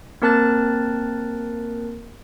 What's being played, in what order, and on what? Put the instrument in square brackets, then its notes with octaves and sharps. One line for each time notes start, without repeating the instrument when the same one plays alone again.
[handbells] A#3 C4 A#4 A5 F#6 A6